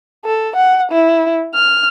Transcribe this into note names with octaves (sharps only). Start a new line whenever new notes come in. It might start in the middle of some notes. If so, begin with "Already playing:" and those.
A4
F#5
E4
F6